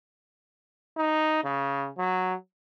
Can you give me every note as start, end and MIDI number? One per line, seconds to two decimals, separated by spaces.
0.97 1.40 63
1.44 1.89 49
1.98 2.34 54